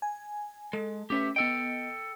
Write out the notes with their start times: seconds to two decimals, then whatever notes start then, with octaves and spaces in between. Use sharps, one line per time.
0.02 G#5
0.73 G#3 A4
1.10 A3 C#4 G4 B4 E5
1.36 B3 A4 D#5 G5